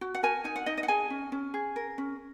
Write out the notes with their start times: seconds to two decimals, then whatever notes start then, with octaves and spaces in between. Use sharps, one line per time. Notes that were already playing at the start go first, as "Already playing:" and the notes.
0.01 F#4
0.15 F#5
0.23 A#4 G#5
0.44 D#4 G#5
0.56 F#5
0.66 D#4 D#5
0.78 D#5
0.83 F#5
0.88 G#4 G#5
1.10 C#4
1.32 C#4
1.54 G#4
1.76 A#4
1.98 C#4